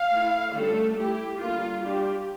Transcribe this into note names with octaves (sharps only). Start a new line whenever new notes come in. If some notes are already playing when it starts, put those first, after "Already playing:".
Already playing: F5
A3 E4
D3 G3 A3 C#4 F4 A4
A3 E4 G4
D3 G3 A#3 F4
G3 D4 F4 G4